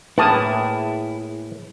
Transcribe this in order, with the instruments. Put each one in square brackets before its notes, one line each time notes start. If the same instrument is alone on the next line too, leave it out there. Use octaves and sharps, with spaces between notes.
[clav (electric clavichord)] A2 A#3 [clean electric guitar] E4 G#4 [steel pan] B4 A5 D#6